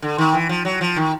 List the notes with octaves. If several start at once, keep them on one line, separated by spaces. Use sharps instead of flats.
D3
D#3
E3
F3
F#3
F3
D#3